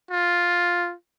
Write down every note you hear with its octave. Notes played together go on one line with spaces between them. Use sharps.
F4